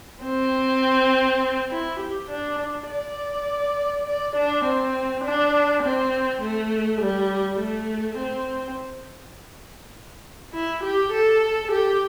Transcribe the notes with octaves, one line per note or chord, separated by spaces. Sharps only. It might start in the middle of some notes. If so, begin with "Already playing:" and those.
C4
E4
G4
D4
D4
D5
D5
D4
C4
D4
C4
A3
G3
A3
C4
E4
G4
A4
G4